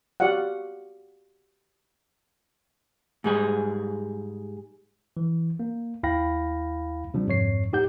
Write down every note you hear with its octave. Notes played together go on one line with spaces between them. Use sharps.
F#4 G4 D5 F5 F#5
G#2 G3 G#4
E3
A#3
D#2 E4 F5 G5 B5 A#6
C3 F3 G3 D4
F2 G#2 C#5 C7
A2 D#4 G4 F#5 G6